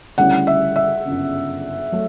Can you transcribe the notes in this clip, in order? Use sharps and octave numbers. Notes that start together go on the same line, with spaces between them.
D2 C#3 G3 C#4 E4 F#5
E5
E5
G1 F#2 C#3
F#3 A3